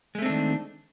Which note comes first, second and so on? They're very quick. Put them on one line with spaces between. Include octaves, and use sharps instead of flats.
G#3 A3 C4 D4 D#3